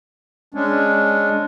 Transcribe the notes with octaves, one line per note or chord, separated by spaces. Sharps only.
G#3 C#4 D4